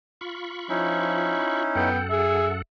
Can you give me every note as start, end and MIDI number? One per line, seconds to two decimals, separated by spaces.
0.21 1.63 65
0.21 1.63 83
0.21 1.63 85
0.69 1.41 53
0.69 1.89 61
0.69 1.89 63
0.69 1.89 64
1.75 2.62 42
1.75 1.98 59
1.75 2.62 69
1.75 2.62 78
1.75 2.04 79
2.10 2.49 68
2.10 2.53 76